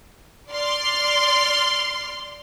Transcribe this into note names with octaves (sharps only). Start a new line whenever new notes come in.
D5 C6 F6